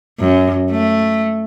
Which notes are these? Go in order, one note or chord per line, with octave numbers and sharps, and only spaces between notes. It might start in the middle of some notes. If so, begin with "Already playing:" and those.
F#2
A3